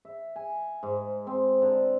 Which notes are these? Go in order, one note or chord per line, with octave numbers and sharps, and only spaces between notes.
E5
G#5
G#2
C4
D3